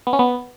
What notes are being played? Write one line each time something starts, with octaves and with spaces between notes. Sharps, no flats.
B3
C#4
B3